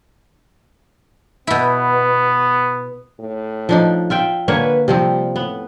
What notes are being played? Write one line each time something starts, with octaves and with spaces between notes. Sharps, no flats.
B2 B3 E4
A2
F3 D4 D#4
F4 E5 G5
D3 A#3 B4 C#5
C3 F3 G3 C4
A2 B3